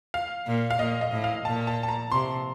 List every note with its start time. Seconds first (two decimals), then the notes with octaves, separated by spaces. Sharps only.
0.14 F5
0.47 A#2
0.70 F5
0.79 A#2 D#5
1.01 D#5
1.12 A2
1.24 F5
1.45 A#2 A5
1.67 A5
1.83 A5
1.88 A#5
2.11 C3 C6